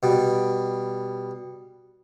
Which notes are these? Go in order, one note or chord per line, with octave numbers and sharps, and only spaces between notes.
B2 G3